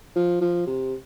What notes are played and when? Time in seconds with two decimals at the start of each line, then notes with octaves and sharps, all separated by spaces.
0.16 F3
0.41 F3
0.67 C3